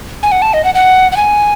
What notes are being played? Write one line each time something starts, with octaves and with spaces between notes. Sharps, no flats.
G#5
F#5
A5
D#5
F#5
F#5
F#5
G#5